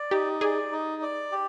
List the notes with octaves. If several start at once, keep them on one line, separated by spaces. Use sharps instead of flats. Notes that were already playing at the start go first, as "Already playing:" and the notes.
Already playing: D5
D#4 G4
G#4 D5
D#4
D5
G4